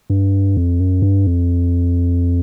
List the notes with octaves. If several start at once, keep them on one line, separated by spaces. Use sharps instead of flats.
G2
F2
F#2
G2
F2